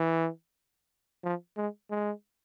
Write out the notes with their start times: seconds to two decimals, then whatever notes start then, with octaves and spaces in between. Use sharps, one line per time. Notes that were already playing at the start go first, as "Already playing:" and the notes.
Already playing: E3
1.24 F3
1.57 G#3
1.91 G#3